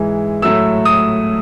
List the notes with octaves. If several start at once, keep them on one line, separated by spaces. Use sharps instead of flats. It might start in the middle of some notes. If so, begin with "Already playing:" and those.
Already playing: G#2 E3 G#3
A2 F#3 A3 E6
D#6